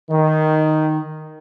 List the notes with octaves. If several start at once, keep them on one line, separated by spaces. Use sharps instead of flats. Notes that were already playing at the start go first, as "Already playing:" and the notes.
D#3